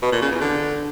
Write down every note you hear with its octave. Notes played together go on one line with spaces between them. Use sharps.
B2
A#2
C#3
E2
D3